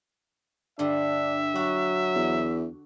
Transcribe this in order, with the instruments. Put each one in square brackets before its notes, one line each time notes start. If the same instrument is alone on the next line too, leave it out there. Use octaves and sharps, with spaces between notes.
[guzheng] G2 D3 [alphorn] D4 [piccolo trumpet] E5
[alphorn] F#3 [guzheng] F#4
[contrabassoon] E2